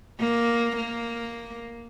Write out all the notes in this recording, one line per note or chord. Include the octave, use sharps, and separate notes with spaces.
A#3
A#3